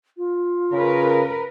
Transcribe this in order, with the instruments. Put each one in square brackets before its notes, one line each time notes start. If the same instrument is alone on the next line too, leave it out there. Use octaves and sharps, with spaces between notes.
[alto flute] F4
[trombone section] C#3 [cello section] A#4 B4